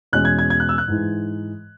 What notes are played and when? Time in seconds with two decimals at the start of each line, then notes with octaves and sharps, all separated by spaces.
0.13 E2 B2 G#3 C#4 F#6
0.25 G#6
0.39 G#6
0.50 G#6
0.60 F#6
0.69 E6
0.78 F#6
0.88 G#2 E3 G#3